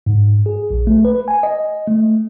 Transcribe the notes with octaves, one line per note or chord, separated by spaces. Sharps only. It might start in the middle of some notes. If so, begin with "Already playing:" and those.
G#2
G#4
A#1
A3
B4
G#5
D#5
A3